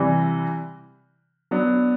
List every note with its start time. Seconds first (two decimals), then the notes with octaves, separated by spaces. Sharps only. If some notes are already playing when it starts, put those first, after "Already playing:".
Already playing: C3 E3 G3
1.51 F#3 B3 D4